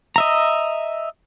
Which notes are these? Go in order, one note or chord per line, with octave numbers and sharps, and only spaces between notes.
D#5 E5 A#5